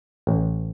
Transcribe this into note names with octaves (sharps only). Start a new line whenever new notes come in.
A1